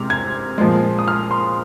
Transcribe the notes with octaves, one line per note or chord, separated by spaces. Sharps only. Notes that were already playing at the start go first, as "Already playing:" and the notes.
Already playing: C3 G#3 F6
G#6
A#2 F3 G#3
D#6
F6
C6